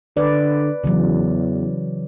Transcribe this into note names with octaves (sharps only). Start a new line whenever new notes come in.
D3 B4 D5
E2 C#3 E3 F#3